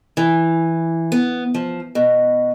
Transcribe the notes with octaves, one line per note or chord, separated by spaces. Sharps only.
E3
B3
F3
B2